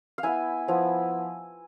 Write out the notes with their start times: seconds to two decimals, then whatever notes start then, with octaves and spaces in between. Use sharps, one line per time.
0.18 F5
0.23 B3 E4 G#5
0.68 F3 B3 E4